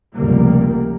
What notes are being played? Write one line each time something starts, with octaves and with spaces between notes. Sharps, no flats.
F1 C#2 G3 A#3